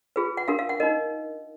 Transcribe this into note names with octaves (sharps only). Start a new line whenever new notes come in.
F4 G#4 B4
F#5
D4 F#4 A#4 F5
F5
F#5
D#4 A#4 D#5